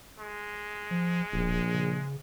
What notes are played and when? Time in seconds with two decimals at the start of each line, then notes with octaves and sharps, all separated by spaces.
0.20 G#3
0.91 F3
1.33 D1 A#1
1.74 C#3